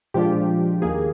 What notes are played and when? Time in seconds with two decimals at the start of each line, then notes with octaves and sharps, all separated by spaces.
0.14 A#2 F3 G#3 D4 F4 G4
0.82 D#2 D#3 A#3 G#4